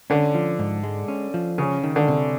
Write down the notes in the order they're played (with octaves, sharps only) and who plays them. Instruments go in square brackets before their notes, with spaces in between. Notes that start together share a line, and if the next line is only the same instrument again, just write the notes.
[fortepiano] D3 [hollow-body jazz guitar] C#4
[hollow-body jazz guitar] F3
G#2
G#3
C#4
F3
[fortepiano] C#3 [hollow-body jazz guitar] C#4
[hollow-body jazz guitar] D#3
[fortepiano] D3
[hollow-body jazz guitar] C3